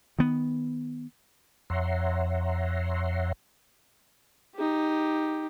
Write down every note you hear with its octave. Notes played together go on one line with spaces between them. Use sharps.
D#3 B3
F2 C#5 E5 F#5 A#5 C6
D#4 G4